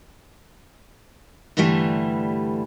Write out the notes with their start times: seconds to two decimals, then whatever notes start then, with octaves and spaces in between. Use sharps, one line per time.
1.57 G2 D3 E3 G3 A3